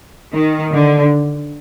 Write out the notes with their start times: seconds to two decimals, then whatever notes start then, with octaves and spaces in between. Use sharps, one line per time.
0.33 D#3
0.73 D3